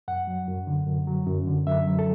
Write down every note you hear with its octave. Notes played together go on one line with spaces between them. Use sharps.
F#2 F#5
F#3
F#2
D3
F#2
F#3
F#2
D3
F#2 E5
F#3
A4